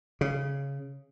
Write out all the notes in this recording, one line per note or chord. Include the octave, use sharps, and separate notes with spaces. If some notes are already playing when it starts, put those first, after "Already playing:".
C#3